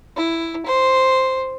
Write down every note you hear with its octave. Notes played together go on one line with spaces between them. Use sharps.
E4
C5